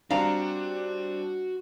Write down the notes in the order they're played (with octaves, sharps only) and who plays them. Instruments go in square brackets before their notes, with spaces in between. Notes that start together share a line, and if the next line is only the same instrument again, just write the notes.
[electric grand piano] G3 C4 D4 [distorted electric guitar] F#4 [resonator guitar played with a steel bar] F5 A#5